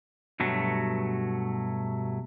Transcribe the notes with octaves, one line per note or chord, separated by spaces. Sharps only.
G2 B2 F#3 A3